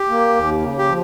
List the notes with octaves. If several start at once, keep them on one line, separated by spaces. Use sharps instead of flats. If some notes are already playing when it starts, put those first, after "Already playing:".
Already playing: G4
A#3
D#2
C#3
G4
F3